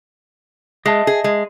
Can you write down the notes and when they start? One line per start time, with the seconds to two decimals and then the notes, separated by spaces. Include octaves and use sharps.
0.86 G#3 D#5 E5 A5
1.07 G#4
1.24 G#3